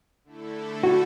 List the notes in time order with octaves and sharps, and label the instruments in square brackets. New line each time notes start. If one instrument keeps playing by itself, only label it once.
[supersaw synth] D3 A3 E4 A4
[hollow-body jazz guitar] F#4